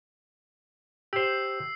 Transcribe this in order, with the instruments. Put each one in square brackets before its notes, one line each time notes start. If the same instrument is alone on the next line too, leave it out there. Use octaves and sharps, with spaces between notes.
[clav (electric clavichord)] G4 C5 [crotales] E6 C7